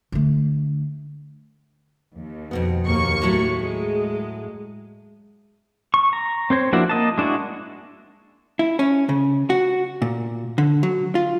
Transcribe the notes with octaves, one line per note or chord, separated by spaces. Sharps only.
D3 A3
D#2
F2 B2 B3
D#2 A#3 C#6
A2 F#3 A3
G#3
C#6
A#5
C4 C5 C#5
F3 A#3 D4 E4 F#4
A#3 D#5 A5
G#3 D4 E4 F#4
E4
C#4
C#3
F#4
A#2
D3
F#3
F4